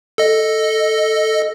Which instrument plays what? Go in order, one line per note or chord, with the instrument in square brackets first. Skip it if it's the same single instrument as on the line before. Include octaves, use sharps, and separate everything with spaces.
[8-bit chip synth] A4 D#5